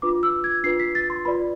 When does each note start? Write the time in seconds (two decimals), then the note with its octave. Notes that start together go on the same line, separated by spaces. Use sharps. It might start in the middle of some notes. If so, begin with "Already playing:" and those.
0.02 D4 F4 B4 D6
0.23 E6
0.44 G#6
0.64 D4 F4 B4 C7
0.80 B6
0.95 A6
1.10 C6
1.25 F4 B4 D5 B5